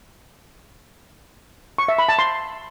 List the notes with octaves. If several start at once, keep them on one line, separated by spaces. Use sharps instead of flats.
C#6
E5
B5
A5
C6